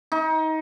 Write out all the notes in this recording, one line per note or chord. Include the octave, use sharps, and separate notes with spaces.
D#4